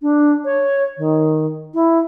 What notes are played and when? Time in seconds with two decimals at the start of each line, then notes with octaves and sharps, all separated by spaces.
0.01 D4
0.45 C#5
0.97 D#3
1.74 E4